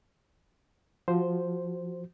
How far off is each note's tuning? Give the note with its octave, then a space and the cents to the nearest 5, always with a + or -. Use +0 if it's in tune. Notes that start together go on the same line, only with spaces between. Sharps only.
F3 +0 F#4 +0 C5 +0